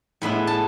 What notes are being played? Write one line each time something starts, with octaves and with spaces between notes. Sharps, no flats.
A2 G#3 B3 E4 B5
A5